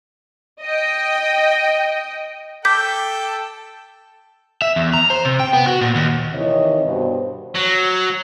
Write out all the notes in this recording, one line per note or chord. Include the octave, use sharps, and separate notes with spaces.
D#5 G5
A4 G5 D6 G6 B6
E5
E2
A#5
C5
C3
G5
B3
F#4
A#2
D#2
C3 D#3 E3 C#5 D#5
G2 B2 C5
F#3